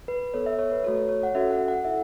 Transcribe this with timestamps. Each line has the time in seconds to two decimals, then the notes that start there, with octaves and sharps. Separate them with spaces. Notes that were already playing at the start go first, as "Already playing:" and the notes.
0.08 B4
0.34 B3 A4 C#5
0.46 E5
0.59 C#5
0.72 B4
0.84 A3 F#4 A4 C#5
1.09 C#5
1.23 F#5
1.35 C#4 F#4 A4 E5
1.51 F#5
1.68 F#5
1.85 E4 A4 E5